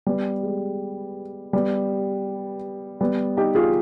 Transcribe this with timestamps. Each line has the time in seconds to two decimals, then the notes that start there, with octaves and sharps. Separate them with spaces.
0.06 G3 B3
0.43 G#3
1.53 G3 B3
3.01 G3 B3
3.37 D#4 G4
3.55 F4 G#4